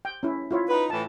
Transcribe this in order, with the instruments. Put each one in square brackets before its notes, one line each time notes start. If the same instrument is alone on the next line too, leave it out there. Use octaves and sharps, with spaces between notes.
[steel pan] G5
C#4 E4
E4 F4 C#5
[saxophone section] D#4 B4
[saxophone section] A2 E3 [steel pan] A5